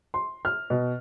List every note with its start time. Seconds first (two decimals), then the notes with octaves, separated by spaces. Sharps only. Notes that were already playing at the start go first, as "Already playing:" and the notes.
0.14 C6
0.45 F6
0.70 B2